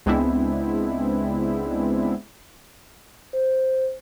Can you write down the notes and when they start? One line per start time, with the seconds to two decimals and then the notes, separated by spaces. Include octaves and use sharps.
0.06 C#2 G#3 B3 C4 D4 E4
3.33 C5